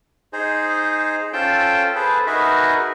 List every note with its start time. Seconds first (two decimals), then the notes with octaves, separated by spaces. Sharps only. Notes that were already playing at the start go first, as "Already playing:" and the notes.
0.33 D#4 G#4 C5
1.33 C#4 F4 A4 C5 G5 A5
1.95 G#4 A4 B4 C5
2.27 D#4 F#4 G#4 A#4 B4 E5